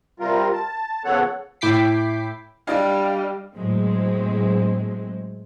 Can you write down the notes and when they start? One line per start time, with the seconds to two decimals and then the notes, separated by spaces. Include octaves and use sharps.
0.20 C3 G3 F4 A#4
0.53 A5
1.05 C#3 F3 B3 A4 C#5 F#5
1.61 A2 E4 G5 D6 B6 C7
2.67 G3 D4 D#5 F5
3.58 A2 F#3 G#3 C4